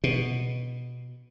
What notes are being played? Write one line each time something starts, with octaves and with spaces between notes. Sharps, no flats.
B2